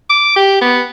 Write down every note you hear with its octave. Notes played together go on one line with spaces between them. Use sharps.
D6
G4
B3